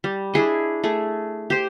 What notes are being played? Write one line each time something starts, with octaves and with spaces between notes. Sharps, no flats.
G3
D4 E4 G#4 D#5
A3 G#4
G4 C5